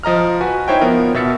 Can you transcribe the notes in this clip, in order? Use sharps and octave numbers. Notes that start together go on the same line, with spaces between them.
F3 D#5 A#5 F6
F#4 B4 G#5
D#4 E4 C5 C#5 E5 G5
F3 B3 A#4
B2 E5 A6 C#7